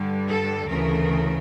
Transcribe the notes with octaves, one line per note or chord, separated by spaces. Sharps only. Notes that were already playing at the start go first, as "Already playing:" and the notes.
Already playing: G2 D3 G3
A4
D2 C#3 E3 A3 A#4